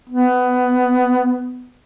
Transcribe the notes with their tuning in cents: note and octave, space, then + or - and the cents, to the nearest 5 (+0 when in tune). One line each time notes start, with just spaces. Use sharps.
B3 +15